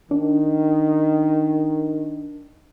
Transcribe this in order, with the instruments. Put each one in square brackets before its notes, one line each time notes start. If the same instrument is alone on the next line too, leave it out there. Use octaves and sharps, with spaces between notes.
[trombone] D#3 [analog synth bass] D4